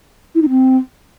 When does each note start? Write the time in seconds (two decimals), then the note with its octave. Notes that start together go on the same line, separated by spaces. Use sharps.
0.35 E4
0.42 D#4
0.49 C4